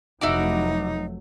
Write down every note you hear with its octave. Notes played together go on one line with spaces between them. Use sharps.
F1 F#3 A3 D#4 E4 F#4 D6